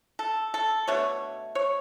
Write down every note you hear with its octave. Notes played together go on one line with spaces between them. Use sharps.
A4
A4
B2 A3 D4 C#5
C#5